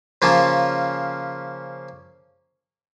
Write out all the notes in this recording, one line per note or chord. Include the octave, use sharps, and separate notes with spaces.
C#3 F3 A#3 C#4 F4